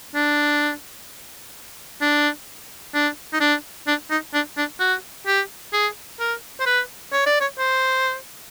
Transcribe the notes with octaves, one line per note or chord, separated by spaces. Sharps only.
D4
D4
D4
D#4
D4
D4
D#4
D4
D4
F#4
G4
G#4
A#4
C5
B4
C#5
D5
C#5
C5